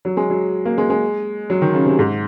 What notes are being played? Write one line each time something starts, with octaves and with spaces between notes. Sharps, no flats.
F#3
G#3
F#3
A#3
G#3
G#3
F#3
D#3
C#3
C3
G#2